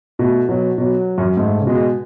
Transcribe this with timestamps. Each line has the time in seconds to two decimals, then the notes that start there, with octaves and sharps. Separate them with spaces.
0.19 B2 A3
0.48 B2 F#3
0.78 B2 F#3
1.18 F#2
1.37 G#2 A3
1.60 C#3
1.66 B2 G#3